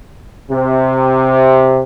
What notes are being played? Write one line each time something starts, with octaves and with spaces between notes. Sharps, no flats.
C3